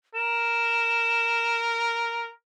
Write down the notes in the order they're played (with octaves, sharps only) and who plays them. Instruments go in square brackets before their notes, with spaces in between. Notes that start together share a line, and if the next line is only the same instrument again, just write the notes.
[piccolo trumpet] A#4 [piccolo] E7